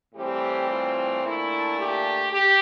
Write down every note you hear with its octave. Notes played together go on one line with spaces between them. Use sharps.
A2 E3 G3 C4 G4
F4
A#2 A3 D4 E4
G4
G4